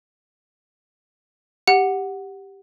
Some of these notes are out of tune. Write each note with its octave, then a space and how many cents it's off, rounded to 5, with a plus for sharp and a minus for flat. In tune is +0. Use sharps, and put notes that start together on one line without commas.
G4 +0 F#5 +0